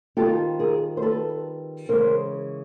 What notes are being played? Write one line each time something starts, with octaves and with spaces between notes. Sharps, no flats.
D#3 G3 C4 F4 G4 A4
G#4 A#4
C5
A4 B4
C#3 E3 G#3 C#4 A#4 C5